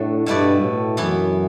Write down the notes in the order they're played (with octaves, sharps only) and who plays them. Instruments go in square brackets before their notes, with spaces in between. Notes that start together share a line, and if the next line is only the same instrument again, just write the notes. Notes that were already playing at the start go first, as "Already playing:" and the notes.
Already playing: [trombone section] A2 [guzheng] A3 D4 F#4 A4
[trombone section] G2 [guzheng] B2 A3 E4 B4 D5
[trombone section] A2
[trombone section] F#2 [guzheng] E3 B3 E4